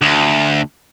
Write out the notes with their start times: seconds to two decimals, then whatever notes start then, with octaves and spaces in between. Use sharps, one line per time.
0.02 D2